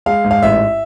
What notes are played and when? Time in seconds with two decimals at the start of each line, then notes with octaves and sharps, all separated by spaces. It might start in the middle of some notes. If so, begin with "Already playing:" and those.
0.06 G#3 F5
0.24 G#2
0.31 F5
0.43 A1 E5